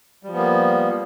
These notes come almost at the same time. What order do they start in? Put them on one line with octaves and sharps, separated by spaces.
G3 F3 B3 A#3